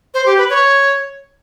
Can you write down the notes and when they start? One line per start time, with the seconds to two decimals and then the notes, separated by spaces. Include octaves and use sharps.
0.14 C5
0.26 G4
0.38 B4
0.50 C#5